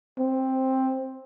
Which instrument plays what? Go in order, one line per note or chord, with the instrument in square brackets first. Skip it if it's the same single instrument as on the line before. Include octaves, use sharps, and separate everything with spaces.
[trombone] C4